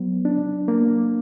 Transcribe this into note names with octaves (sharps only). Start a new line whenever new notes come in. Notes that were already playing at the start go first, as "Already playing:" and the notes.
Already playing: F#3 B3
D4
A#3